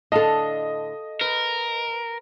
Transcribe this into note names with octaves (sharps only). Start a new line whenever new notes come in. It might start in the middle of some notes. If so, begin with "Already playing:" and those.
A2 D3 A4 D#5 F5 A5
A#4 B4